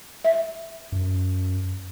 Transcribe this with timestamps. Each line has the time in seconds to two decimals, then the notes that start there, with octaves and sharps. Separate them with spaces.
0.25 E5
0.92 F#2